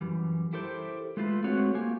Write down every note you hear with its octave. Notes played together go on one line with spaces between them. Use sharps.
F#2 E3 G3
E4 G4 A4 A#4 C5
G#3 A3 F4 B4
G#3 A3 C4 F#4 B4 C#5
A#3 F4 G4 G#5